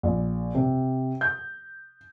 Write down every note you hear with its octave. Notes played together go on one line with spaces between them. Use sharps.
A#1
C3
G6